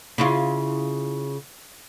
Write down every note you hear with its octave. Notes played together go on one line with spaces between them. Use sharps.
C#3 E4 F4